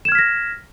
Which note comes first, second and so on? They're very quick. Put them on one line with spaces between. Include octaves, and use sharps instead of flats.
E7 G#6 F6 B6 A#6